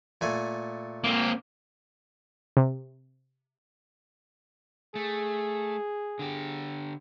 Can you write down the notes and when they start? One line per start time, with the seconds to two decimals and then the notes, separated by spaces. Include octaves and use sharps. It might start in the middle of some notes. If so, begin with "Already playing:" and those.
0.21 A#2 A3 G#5
1.04 A#3 C4
2.57 C3
4.95 A3 G#4
6.19 D3 G4